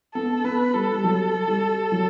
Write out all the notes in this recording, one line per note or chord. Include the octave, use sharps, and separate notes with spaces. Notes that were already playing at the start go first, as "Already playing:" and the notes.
B3 A4
B3 B4
G3 A4
G3
F#3
G3
F#3